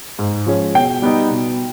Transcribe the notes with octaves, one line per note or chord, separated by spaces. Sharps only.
G#2
F3 G#3 C#4
B2 G5
G3 B3 D#4
B2